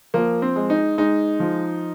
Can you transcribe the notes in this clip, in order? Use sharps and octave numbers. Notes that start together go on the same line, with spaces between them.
F3 A#3
C4
G#3
D#4
G#3 D#4
F3